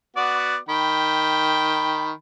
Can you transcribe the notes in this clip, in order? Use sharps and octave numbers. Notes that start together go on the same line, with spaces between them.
B3 F#4 D5
D#3 G5 B5